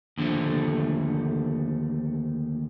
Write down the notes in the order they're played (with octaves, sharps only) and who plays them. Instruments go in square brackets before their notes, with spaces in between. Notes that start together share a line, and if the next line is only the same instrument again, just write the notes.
[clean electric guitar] D#2 D3 E3 F3 A3